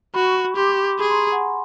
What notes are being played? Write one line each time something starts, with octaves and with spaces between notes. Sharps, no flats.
F#4 B5 C#6
G4 C6 D6
G#4 B5 C#6
A#5 C6
F#5 G#5